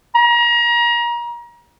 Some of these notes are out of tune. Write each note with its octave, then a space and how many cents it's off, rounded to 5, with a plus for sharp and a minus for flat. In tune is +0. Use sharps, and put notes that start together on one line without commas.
A#5 +30